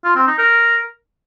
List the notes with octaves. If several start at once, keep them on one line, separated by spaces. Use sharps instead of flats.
F4
C4
D#4
A#4